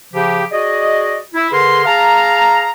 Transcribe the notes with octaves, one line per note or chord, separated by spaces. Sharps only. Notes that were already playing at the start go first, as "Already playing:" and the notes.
C#3 F3 G4
F#4 G#4 D5 D#5
E4
D3 G#4 A#4 B4 C6
G#4 F5 A5 A#5